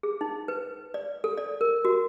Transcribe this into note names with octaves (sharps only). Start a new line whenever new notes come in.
G#4
D#4
B4
D5
A4
D5
A#4
F#4